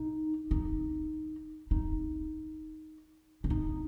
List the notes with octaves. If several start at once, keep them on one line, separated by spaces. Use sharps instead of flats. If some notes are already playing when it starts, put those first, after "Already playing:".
Already playing: D#4
D#4
D#4
D4
D#4